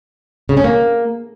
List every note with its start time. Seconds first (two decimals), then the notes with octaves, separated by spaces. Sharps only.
0.49 C#3
0.57 C#4
0.64 A#3